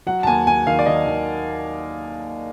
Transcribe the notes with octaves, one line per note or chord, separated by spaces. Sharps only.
F#3 F#5
A5
D#2 G#5
D#2 G#5
D#3 F5
D5
D#3 D#5
D#3